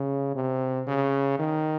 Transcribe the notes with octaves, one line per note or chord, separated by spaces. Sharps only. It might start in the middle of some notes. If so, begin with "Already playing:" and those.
Already playing: C#3
C3
C#3
D#3